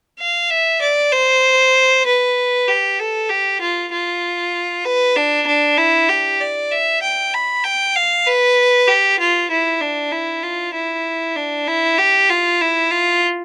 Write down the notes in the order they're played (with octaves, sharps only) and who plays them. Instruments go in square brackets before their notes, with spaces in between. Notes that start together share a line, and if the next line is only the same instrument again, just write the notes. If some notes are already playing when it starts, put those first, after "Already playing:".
[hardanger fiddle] F5
E5
D5
C5
B4
G4
A4
G4
F4
F4
B4
D4
D4
E4
G4
D5
E5
G5
B5
G5
F5
B4
G4
F4
E4
D4
E4
F4
E4
D4
E4
G4
F4
E4
F4